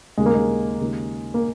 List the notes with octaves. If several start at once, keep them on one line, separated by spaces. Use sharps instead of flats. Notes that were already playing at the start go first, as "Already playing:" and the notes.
D#2 C#3 G#3
A#3
G#3
D#2 C#3
A#3